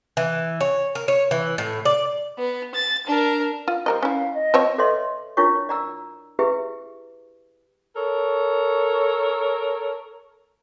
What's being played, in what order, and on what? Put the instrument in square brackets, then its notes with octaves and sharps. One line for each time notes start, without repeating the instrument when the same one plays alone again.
[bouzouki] E3
C#5
A#4
C#5
E3
A2
D5
[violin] B3
A6
D4 A#4
[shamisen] F4
[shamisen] G3 A#4 D#5 [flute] C5
[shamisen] C#4 E4 [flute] F5
[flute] D#5
[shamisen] F3 C4 C#5
[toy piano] A4 B4 C#5 D#5 E5 C6
D4 E4 F4 A#4 C#5 C#6
D5 A#5 E6
E4 G4 G#4 B4 E5
[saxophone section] A4 A#4 C#5